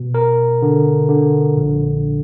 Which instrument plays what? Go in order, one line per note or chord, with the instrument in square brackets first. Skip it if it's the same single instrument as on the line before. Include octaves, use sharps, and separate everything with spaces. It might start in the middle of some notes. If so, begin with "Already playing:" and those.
Already playing: [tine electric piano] B2
A#4
D3
D3
A#1